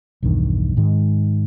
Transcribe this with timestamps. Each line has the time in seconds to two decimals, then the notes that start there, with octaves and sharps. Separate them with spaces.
0.23 B1 E2 G2 D#3
0.77 G#2 D#3 G#3